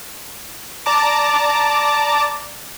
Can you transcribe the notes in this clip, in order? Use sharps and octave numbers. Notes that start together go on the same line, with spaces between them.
D5 A5 A#5 D6